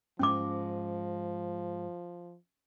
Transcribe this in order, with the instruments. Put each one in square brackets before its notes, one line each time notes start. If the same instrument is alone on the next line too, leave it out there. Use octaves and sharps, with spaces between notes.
[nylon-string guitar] G#2 G#3 [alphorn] F3 [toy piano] C#4 D6